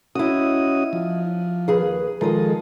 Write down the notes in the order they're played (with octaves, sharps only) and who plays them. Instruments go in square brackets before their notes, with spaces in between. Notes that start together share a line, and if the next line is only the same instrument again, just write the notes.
[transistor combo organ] C#4 F#4 D#6 [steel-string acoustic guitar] E4 D#5
[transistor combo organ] F3
[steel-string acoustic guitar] D#2 G#4 B4
[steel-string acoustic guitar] D#3 F4 D#5 [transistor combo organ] F3 G#3 A4